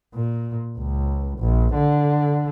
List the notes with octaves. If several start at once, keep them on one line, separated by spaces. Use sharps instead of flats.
A#2
C#2
A#1
D3